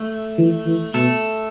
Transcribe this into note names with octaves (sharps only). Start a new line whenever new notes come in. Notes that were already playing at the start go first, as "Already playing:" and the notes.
Already playing: A3
E3
E3
B2 A3 A4